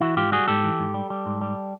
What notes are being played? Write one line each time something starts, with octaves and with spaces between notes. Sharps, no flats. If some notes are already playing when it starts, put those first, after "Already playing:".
E3 E4 F#4
G#2 F4 G4
G3 F#4 G#4
G#2 G4 A4
E3
G#2
G3
G3
G#2
G3